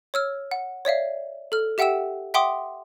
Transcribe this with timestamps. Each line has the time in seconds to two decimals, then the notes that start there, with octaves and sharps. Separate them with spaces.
0.14 C#5 E6 F6
0.51 F#5
0.85 C#5 D5 E5 F5
1.52 A4 F6
1.78 G4 E5 F#5 G5 E6 E7
2.34 E5 F#5 G5 C6 D6 D#6